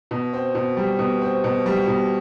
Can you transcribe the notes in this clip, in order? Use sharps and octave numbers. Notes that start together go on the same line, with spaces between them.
B2
C4
B2
G3
B2
C4
B2
G3
B2